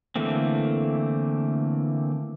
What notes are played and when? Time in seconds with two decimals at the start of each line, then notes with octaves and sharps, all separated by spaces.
0.16 D3 E3 A3 A#3 C4